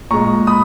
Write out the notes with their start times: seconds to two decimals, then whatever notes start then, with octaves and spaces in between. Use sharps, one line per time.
0.11 A#2 G#3 A#5 C#6
0.47 B5 D#6